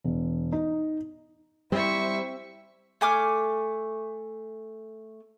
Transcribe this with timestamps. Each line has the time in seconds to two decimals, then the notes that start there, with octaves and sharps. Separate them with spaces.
0.04 E1
0.52 D#4
1.72 G3 C4 E4 C5 E5 C#6
3.01 A3 G#5 D6 F6